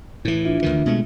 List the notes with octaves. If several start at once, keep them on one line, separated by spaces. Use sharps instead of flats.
A2 E3 E4
D4 F4 E5
D2 D#3 E3
B2 G#3 A3